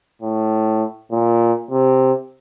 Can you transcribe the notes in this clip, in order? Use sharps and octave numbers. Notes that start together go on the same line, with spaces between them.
A2
A#2
C3